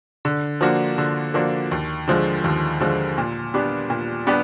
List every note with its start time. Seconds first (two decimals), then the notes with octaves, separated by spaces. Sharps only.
0.25 D3
0.61 F3 A#3 D4 F#4
0.98 D3
1.34 F3 A#3 D4 F#4
1.71 D#2
2.08 D3 F3 G#3
2.44 D#2
2.80 D3 F3 G#3
3.18 A#2
3.54 G3 B3 D4 G4
3.90 A#2
4.27 G3 B3 D4 G4